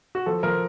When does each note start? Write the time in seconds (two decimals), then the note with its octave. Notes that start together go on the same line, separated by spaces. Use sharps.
0.15 F#4
0.26 F3 A4
0.43 F3 A#4